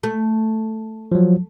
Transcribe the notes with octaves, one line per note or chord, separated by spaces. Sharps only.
A3
F3 F#3